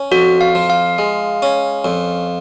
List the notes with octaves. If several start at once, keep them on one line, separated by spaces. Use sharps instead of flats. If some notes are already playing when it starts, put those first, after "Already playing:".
Already playing: C#4
F2 F#4
F5
F3
F5
G#3
C#4
F2